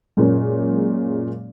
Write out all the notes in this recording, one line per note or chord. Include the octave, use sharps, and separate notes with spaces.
F#2 A#2 G#3 A#3 C#4